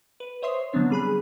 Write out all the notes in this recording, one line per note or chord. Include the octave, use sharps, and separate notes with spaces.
B4
C5 C#5 E5 C6 D#6 C7
D3 F#3 B3 C4 D4 C#5
G3 G#4 B5 F#6